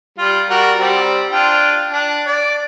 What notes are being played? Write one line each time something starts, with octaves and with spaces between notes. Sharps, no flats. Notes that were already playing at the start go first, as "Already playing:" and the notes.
G3 F4
G3 F#4 A#4
G3 C4 G4
D4 F4 G5
D4
D5